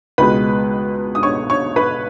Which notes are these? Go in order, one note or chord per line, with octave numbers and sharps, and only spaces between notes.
C#2 B2 G#3 B4 B5
D#6
C#5 C#6
C#5 C#6
B4 B5